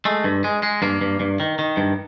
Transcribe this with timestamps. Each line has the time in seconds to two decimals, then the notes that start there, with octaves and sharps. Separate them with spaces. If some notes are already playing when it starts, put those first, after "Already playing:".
0.05 G#3 A3
0.24 G2
0.44 G#3
0.63 G#3
0.82 G2 A#3
1.01 G2
1.20 G2
1.40 D#3
1.59 D#3
1.77 G2